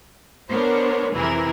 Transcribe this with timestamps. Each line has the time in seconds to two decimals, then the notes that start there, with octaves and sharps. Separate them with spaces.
0.50 B3 D4 A#4 C5 C#5
1.15 F2 C3 E3 E4 G#4 A#4